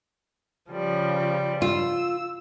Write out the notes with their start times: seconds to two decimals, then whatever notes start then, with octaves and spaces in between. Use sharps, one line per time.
0.70 C#3 F3 G3
1.62 F4 E6